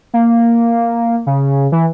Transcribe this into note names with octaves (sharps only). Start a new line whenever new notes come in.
A#3
C#3
E3